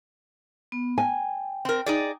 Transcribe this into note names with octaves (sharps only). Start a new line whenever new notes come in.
B3
G5 G#5
C4 A#4
D#4 G#4 D5